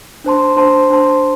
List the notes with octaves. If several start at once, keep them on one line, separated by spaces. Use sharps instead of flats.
D4 C5 A5 C6
D4 C5 A5 C6
D4 C5 A5 C6